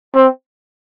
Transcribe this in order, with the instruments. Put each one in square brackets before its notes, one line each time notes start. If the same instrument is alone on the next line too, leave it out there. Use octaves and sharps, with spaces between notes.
[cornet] C4